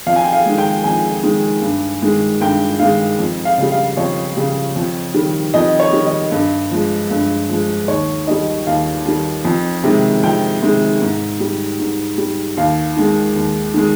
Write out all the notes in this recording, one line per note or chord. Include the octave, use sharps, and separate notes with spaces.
F2 F5
G#5
G5
F5
D#3 G#3
G5
F2 G#5
D#3 G#3
G2
D#3 G#3
G2 G5
D#3 G#3 F5
F2
F5
C#3 G3
F5
F2 C#5
C#3 G3
F2
D#3 G3
F2 D#5
C#5
D#3 G3
D#5
G2
F3 G#3
G2
F3 G#3
D#2 C#5
D#3 G3 D#5
D#2 F5
D#3 G3
F2
C3 D#3 G#3
F2 G5
C3 D#3 G#3
G#2
G3
G#2
G3
D#2 F5
D#3 G#3
D#2
D#3 G#3